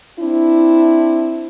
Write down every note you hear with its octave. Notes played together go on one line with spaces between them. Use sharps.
C4 D4 E4